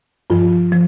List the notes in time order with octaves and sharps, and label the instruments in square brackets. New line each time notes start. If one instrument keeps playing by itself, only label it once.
[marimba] G2 F3 F4
F3